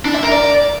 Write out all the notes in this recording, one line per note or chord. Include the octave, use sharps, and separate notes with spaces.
D4
E5
A#4
D5